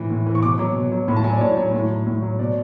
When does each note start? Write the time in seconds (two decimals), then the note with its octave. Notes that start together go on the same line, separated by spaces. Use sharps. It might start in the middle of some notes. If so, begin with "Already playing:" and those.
Already playing: A2 E3
0.10 A2
0.27 E3
0.35 C#6
0.43 B2 D6
0.59 F#3
0.76 B2
0.92 F#3
1.08 A2 B5
1.16 A5
1.24 F#3 G#5
1.33 D5
1.41 A2 C#5
1.57 F#3
1.73 A2
1.90 F#3
2.07 A2
2.22 F#3
2.39 B2 D5